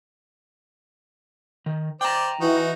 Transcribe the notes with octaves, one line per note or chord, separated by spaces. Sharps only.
D#3
C5 D5 G5 A#5
E3 D#4 F#4